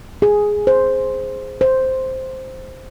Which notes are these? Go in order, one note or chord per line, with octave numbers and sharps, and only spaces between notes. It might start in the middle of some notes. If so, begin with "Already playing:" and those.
G#4
C5
C5